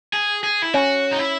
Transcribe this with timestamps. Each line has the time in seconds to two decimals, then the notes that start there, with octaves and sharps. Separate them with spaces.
0.13 G#4
0.43 G#4
0.62 E4
0.74 C#4 F#4
1.12 D#4
1.19 E4